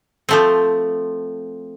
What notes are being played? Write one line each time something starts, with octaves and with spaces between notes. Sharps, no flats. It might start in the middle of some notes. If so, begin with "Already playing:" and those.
F3 A3 C4